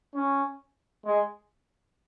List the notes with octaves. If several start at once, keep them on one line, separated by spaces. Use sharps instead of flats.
C#4
G#3